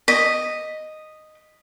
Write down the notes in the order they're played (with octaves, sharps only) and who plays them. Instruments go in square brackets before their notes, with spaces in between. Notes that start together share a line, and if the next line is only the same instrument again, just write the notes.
[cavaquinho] D#5 [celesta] B6